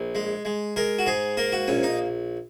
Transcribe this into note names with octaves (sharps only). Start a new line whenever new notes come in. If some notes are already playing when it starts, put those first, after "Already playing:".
Already playing: A#1
G#3
G#3
G#3 A#4
F#4
G#2 G#4
A#3 A#4
F#4
A#1 C#4
D#4